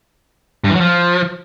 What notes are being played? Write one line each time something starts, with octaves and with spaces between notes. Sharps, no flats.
G2
E3
F#3
F3